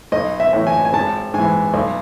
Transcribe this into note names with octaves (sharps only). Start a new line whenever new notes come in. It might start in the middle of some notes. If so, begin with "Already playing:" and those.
B1 D#5
E5
A2 E3
G#5
G#5
G#1 A5
G#2 E3 G#5
B1